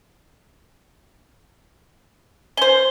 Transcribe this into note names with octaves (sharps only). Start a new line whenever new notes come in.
C#4 C5 G7